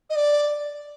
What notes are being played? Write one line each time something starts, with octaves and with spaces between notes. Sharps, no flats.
D#5
D5